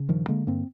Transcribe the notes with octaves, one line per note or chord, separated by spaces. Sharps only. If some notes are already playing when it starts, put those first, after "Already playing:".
Already playing: C#3
G2 D#3 F3
D3 G#3 A#3
G2 A#3 C4